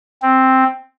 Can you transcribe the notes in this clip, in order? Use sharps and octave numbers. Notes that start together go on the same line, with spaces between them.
C4